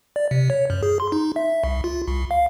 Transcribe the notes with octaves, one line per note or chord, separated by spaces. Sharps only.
D5
C3
C#5
F#2
G#4
C6
D#4
E5
C2
F4
C2
F5